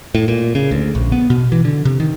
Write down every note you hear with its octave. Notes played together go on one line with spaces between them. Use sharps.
A2
A#2
C#3
D2
A#1
B3
B2
E3
D3
C3
D#3